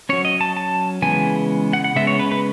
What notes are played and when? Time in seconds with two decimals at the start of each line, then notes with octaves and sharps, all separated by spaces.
0.09 F#3 C#4 C#5
0.25 D#5
0.41 A5
0.57 A5
1.02 C#3 E3 G#3 B3 G#5
1.73 F#5
1.84 F#5
1.96 C#3 G#3 B3 E5
2.07 C#5
2.19 B4
2.31 B4